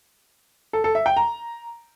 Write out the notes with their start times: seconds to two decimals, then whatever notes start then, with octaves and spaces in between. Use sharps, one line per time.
0.73 A4
0.84 A4
0.95 E5
1.06 G5
1.17 A#5